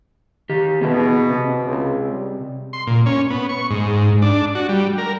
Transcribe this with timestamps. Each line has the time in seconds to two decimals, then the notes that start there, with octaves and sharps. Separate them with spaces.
0.49 D#3 G4
0.81 B2 B3 G#4 B4
1.30 C3
1.67 C#2
2.09 G3
2.73 C6
2.87 A#2
3.06 C#4
3.30 B3
3.49 C#6
3.70 G#2
4.22 D4
4.55 F#4
4.69 G3
4.98 A#4